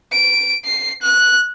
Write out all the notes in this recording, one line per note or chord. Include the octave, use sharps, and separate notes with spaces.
D7
C7
F#6